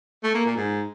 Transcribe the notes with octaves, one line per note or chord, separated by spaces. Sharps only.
A3
A#3
A#2
G#2